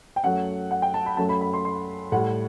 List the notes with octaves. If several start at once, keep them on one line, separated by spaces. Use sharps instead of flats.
G5
F#2 F#3 A3 F#5
F#5
G5
A5
B5
F#2 F#3 A3 A5
B5
B5
C6
C6
A2 G3 F#5